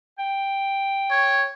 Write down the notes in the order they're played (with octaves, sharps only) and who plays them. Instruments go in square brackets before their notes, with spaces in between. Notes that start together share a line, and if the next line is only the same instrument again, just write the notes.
[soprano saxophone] G5
[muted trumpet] C#5